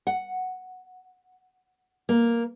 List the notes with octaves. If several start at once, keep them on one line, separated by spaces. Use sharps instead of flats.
F#5
A#3